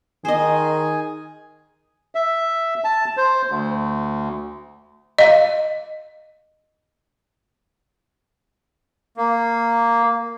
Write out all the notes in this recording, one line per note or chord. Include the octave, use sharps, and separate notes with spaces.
D#3 G#4 C5 D#5 G#5
E5
A5
C5
D2
D#5 F5
A#3